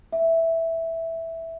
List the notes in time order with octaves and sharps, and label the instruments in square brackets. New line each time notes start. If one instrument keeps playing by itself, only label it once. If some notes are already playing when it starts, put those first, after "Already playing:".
[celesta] E5